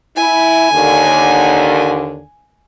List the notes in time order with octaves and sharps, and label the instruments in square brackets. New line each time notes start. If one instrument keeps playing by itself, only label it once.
[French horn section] E4 [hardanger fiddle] G#5
[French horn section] D#2 D3